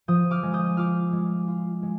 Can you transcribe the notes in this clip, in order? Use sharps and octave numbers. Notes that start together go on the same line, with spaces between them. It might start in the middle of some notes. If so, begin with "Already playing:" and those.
F3 D#6 G6
D6 F6
G#3
D#6 G6
F4 D6 F6
G#3
F4
G#3